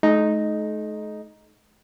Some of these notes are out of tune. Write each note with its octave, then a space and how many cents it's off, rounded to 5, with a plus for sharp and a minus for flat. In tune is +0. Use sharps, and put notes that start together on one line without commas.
A3 -45 D#4 +0